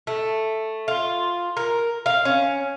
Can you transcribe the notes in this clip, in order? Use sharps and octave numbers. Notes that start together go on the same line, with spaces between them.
A3
F4
A#4
F5
C#4